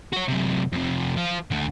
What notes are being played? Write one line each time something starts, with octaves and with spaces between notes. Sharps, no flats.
F#4 C#5
F#2 C3
F2 C3
F3 F4
D2 D3